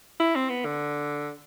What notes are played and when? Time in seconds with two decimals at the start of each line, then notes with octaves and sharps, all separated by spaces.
0.20 E4
0.36 C4
0.50 B3
0.65 D3